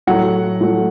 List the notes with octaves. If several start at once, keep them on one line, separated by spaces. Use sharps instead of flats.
A2 F#3 A3 F#5
A2 F#3 A3